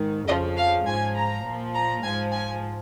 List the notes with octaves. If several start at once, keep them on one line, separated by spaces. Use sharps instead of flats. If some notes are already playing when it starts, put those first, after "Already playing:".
Already playing: G#2 D#3
F2 C#3 F3 D#5
F5
G#2 F3 G#5
A#5
A#2 F3
A#5
G#2 F3 G#5
G#5